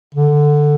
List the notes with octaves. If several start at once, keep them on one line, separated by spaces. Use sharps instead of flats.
D3